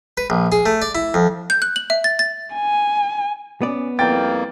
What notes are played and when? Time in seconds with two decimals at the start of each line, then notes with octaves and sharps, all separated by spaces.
0.17 B4
0.30 A#1
0.52 G#4
0.66 A3
0.82 D5
0.95 E4
1.14 F2
1.50 G6
1.62 F#6
1.76 F#7
1.90 E5
2.04 A6
2.19 A6
2.55 G#5
3.62 B3 C#4 D5
3.99 F2 G3 A#3 E4 B4 G5 A6